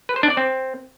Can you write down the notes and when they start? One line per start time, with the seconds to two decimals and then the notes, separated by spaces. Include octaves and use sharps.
0.09 B4
0.16 C5
0.23 D4
0.30 D5
0.37 C4